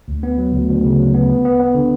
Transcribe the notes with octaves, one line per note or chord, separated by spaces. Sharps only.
D2
B3
F#3
D2
D2
C#3
F#3
B3
B3
B3
B3
D3